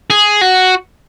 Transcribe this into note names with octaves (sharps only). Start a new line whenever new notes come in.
G#4
F#4